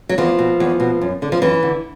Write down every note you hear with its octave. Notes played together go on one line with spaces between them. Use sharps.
F#3
E2 F3
B2
E2
B2
F#2
D3
F3
F#2 E3
D3